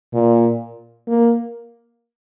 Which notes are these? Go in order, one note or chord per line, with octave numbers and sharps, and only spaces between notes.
A#2
A#3